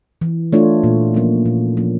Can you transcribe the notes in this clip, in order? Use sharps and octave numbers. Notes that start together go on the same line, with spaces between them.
E3
A3 D4 F4 C#5
A#2
F3 A#3 C#4
A#2
F3 A#3 C#4